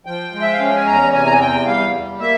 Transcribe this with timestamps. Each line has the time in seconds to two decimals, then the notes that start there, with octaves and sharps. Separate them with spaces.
0.06 F3 G5
0.33 G#3
0.42 E5
0.53 F5
0.59 C#4 G5
0.75 G#5
0.86 E2 A#5
1.13 C3 G#5
1.26 A#5
1.32 G#5
1.40 E2 G5
1.66 G3 F5
1.93 G3
2.19 A#3 E5